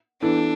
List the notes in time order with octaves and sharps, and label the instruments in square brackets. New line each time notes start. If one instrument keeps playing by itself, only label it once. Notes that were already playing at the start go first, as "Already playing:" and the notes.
[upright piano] E3 B3 E4 A4 [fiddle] D4